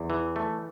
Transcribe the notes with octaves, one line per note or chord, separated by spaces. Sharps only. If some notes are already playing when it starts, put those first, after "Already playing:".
Already playing: E2
E3
A3